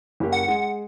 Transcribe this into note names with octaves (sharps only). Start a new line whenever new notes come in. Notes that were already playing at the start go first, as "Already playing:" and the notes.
F#1 A#3 G4
F#5
G#3